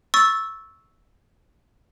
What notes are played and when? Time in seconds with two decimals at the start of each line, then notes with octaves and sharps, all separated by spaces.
0.14 C#6 E6 A6